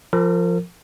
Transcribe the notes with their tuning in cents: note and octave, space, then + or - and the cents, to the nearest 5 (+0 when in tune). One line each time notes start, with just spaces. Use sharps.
F3 +0 A#4 -35